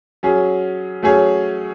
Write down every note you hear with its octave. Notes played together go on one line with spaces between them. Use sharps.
F#3 C#4 G#4
F#3 A3 C#4 G#4 C#5